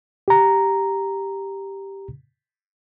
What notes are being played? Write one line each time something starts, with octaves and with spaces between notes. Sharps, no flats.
G4 A#5